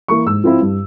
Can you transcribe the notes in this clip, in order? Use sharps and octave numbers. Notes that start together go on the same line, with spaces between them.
E3 A#3 E4 C#6
G#2 E6
F3 C4 E4
G2